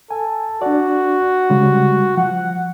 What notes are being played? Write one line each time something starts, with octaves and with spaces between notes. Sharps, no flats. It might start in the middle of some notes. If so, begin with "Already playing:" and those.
A4 G#5
D4 F#4 D5
C#3 G3 G#3
F3 F#5